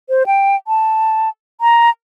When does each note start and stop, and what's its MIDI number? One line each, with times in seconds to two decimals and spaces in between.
0.09 0.23 72
0.26 0.56 79
0.68 1.29 81
1.61 1.90 82